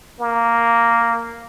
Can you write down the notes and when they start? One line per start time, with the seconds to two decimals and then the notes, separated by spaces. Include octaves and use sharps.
0.20 A#3